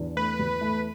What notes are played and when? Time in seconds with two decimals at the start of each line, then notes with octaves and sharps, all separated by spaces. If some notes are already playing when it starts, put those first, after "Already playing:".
Already playing: E2 D4
0.16 A3 B4
0.39 E2
0.61 A3